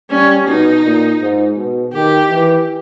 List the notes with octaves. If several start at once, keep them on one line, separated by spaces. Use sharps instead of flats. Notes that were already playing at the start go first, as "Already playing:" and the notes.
G3 C#4
B2 D#4
A#2
G#2
B2
D#3 G4
E3